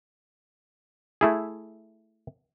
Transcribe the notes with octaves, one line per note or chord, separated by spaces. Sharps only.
A3 E4 G#4